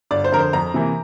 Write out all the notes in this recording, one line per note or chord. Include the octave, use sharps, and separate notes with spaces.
G1 D5
C5
F2 D3 A#4
C5
F2 A#5
C3 E3 A#3